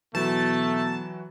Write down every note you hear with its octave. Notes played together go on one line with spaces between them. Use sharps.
B2 E3 F#3 A3 F#4 A5